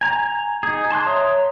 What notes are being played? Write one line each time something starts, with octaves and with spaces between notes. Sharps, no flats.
G#5 A#5
D#4 G#4
A5 C6 C#6 F#6
C#5 E5 A#5 C6 D#6